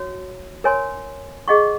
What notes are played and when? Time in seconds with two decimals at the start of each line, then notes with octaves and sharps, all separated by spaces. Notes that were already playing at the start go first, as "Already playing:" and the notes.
Already playing: F#4 C#5
0.64 A#4 C#5 G#5 C6
1.48 G#4 D#5 F#5 C#6